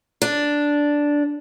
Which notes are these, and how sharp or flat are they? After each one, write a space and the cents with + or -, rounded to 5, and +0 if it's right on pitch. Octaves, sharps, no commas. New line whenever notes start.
D4 -5